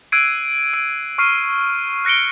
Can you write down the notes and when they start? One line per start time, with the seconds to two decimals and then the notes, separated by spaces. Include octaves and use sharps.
0.12 E6 F#6 G#6 C7 D7 D#7
0.73 E6 D7
1.18 C#6 F6 C7 D#7
2.05 F#6 A#6 C#7 D7 G7